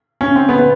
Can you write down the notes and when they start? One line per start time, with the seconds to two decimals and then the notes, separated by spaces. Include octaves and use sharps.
0.21 C#4
0.36 C4
0.49 B3
0.59 B3